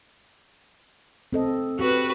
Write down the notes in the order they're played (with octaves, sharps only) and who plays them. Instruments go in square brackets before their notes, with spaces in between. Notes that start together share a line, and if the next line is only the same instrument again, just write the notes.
[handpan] C4 A4 D#5
[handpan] C4 G4 [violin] F#4 B4